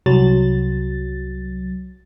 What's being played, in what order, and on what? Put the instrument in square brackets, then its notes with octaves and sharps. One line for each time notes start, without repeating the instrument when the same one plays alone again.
[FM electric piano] C2 F#3 A6